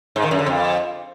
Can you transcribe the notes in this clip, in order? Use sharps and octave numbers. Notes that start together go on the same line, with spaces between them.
G#2
D#3
F#2
D3
F2